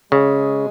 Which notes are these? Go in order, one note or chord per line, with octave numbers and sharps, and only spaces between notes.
C#3 G#3